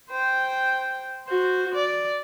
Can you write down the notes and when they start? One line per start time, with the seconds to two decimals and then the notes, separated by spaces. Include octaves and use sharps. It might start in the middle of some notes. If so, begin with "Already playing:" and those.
0.10 C5 G5
1.28 F#4 C5
1.75 D5